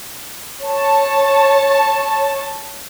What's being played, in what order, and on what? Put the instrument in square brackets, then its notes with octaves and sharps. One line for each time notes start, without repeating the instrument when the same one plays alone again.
[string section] C#5 A5